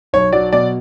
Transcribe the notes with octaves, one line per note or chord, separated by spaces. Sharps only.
B1 C#5
F#3 D5
B2 D5